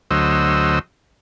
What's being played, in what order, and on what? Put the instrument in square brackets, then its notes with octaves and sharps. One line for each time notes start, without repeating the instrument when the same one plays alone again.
[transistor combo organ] D2 F#3 C5 D#5 E6